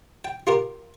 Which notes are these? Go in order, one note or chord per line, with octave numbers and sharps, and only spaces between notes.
G5
F4 G4 A#4